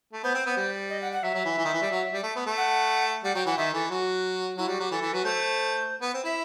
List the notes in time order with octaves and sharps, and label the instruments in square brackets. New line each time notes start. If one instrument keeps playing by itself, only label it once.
[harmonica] A3
[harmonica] B3 [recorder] C5
[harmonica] C4
B3
G3
[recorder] D#5
F#5
F#5
[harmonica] F#3 [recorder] E5
[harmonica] F#3
E3
E3
D#3
E3
G3
F#3
G3
A3
B3
A3
[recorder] F#5
[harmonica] G3 [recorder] F#5
[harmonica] F#3 [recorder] G5
[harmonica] E3 [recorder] F#5
[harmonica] D#3 [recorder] E5
[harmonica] E3 [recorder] A4
[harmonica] F#3 [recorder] F#4
[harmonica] F#3 [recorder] E4
[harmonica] G3 [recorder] F#4
[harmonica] F#3 [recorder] G4
[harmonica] E3 [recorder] A4
[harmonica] E3
[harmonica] F#3 [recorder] B4
[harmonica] A3 [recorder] C5
[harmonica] B3
C4
[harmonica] E4 [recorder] E5